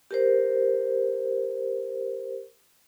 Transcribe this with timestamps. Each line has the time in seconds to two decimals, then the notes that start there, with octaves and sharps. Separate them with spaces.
0.11 G4 A#4 C5